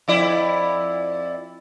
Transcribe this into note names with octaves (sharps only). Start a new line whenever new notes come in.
F2 E4 D5